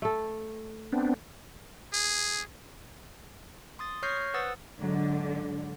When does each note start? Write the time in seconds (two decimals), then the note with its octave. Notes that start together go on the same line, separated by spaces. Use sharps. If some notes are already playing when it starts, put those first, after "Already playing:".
0.02 A3 A4
0.93 B3 C4 D4
1.93 G#4
3.79 C6 D#6 A6
4.03 C#5 C#6 F6 G6 A#6 C7
4.34 B4 C5 F#5 D#6 E6 A6
4.81 G#2 D3 F#3